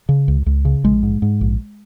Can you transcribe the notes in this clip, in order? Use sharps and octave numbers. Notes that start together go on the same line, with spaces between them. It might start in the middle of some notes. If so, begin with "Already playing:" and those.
C#3
C#2
C#2
C#3
A#1 G#3
G#2
G#2
A#1